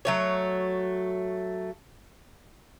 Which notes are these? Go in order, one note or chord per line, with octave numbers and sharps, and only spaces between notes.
F#3 A3 C#5